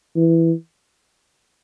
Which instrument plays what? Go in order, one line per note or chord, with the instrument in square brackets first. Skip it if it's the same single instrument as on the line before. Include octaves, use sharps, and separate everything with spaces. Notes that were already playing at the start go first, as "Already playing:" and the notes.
[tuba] E3